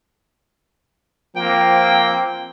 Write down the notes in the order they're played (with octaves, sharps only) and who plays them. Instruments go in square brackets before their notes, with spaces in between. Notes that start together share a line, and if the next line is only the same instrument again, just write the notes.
[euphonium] F3 [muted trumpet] A#3 [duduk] C4 [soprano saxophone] G5